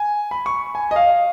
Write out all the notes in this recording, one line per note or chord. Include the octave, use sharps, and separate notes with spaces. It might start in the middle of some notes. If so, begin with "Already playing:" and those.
Already playing: G#5
B5
C#6
G#5
D#5
F5